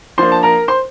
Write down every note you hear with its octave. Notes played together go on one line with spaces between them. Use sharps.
F3 A#3 D4 C5 C6
A5
A#4 A#5
C5 C6